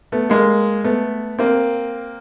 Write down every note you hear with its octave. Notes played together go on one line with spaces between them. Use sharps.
A3 B3
G#3 A#3
A3 B3
A#3 C4